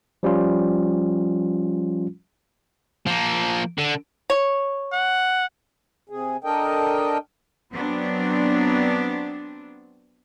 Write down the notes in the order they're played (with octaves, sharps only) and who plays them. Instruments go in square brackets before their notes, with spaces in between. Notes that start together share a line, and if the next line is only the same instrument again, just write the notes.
[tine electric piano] F3 G3 C#4 F4
[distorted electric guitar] F3 A#3
D3
[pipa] C#5
[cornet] F#5
[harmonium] C3 G#4
D4 A4 A#4 D#5 G5
[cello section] F#3 B3 C4 D4